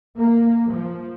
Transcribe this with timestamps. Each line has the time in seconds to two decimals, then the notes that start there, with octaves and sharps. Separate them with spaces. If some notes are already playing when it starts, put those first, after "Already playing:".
0.18 A#3
0.71 F3